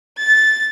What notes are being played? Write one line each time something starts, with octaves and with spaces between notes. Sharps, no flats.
A6